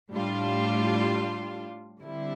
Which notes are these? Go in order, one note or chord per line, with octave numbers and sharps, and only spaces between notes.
A2 G3 D4 F4
D3 G3 C4 E4